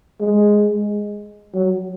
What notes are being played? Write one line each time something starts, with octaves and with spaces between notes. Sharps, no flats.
G#3
F#3